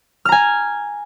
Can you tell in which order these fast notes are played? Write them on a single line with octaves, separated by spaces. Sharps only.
F6 A#5 G#5